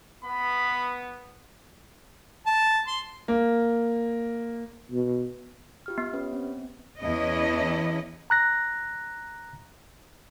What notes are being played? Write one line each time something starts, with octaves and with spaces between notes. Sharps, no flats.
B3 B5
A5
C6
A#3
B2
F4 G4 F6
B3
C#4 G4 B4
C4
E2 C#4 E4 D#5
A#5 F#6 A#6